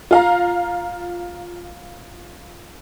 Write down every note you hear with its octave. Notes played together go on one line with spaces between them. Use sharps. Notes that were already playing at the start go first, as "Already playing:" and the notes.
F4 F5 A#5